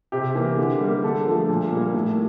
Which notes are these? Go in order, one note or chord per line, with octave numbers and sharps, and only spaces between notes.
C3 G4
E3 A#3
D3
G3 A#3
D3 A4
F3 A3
A#2
G3 A#3
A2